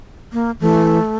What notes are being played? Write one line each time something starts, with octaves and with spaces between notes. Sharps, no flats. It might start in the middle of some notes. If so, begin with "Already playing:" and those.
A#3
E3 A3